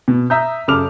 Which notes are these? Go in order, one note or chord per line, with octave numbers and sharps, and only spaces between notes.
B2
E5 A#5 D#6 G6
F#2 C#3 A4 D6 F6 F7